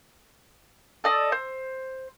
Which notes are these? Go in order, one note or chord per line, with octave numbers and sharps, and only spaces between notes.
A4 D5 D#5
C5